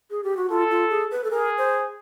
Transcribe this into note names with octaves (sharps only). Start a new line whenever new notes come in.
G#4
G4
F#4
F4 A4
F4
G#4
B4
A4
G#4 A#4
C5